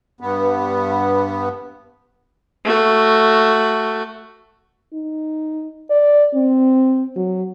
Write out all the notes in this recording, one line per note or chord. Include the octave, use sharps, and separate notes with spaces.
G2 B3
A3 F#4
D#4
D5
C4
F#3